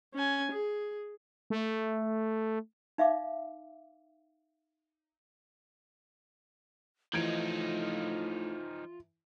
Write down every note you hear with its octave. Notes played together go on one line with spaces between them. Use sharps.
C#4 G#5
G#4
A3
D#4 E5 F5 D6
A2 E3 F3 D#4 F4 G#6 D7